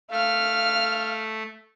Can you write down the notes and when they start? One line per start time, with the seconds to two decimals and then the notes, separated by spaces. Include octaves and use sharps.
0.11 A3 F5 F6